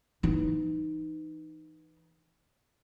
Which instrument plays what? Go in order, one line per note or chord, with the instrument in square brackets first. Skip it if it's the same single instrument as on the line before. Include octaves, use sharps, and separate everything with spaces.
[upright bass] E3 D#4